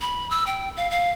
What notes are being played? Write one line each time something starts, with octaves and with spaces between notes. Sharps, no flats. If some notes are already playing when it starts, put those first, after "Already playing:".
B5
E6
G5
F5
F5